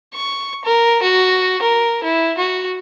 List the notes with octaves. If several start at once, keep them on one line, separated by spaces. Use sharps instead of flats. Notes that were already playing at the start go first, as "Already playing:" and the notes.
C#6
A#4
F#4
A#4
E4
F#4